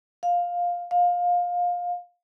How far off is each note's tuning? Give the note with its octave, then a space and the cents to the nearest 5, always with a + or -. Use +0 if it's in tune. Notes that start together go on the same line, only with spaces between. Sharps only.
F5 +10
F5 +20